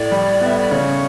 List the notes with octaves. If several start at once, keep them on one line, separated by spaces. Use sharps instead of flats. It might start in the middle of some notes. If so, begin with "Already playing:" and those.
Already playing: A2 D5
G3
B3 E5
D5
C#3 C#5